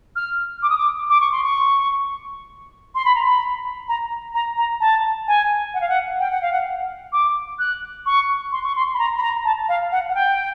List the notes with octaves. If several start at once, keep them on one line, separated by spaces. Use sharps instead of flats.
F6
D6
D#6
D6
D6
C#6
C6
C#6
C6
B5
A#5
B5
A#5
A#5
A#5
A5
G#5
F#5
F5
F#5
G5
F#5
F5
F#5
D6
F#6
C#6
C6
C#6
C6
B5
A#5
B5
A#5
A5
F5
F#5
F#5
G5